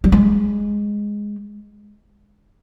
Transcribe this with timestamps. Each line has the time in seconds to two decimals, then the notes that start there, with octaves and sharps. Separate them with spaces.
0.04 G3
0.12 G#3